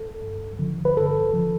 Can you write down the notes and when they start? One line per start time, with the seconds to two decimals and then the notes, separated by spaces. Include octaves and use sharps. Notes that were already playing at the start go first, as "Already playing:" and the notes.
Already playing: A4
0.22 G2
0.59 D3 F3
0.85 B4
0.97 G2 A4
1.34 D3 F3